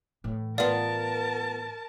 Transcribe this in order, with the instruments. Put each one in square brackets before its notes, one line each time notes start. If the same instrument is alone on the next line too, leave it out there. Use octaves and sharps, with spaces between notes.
[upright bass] A2 E3
[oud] B3 F4 [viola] A#4 A5 [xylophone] D5